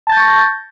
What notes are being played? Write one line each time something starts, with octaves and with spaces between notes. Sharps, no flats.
A5 C#6 G6 A6 A#6